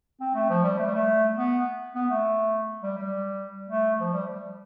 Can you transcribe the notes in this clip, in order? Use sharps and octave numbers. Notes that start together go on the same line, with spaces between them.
C4
A3
F3
G3
A3
G3
A3
B3
B3
A3
G3
G3
A3
F3
G3